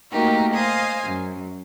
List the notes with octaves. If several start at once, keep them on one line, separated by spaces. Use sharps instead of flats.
A3 A#3 D#4 F#4 G4 A#4
C5 D#5 F5 G#5
F#2